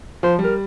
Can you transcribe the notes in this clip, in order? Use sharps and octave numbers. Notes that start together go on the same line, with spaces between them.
F3 C5
G3
A#4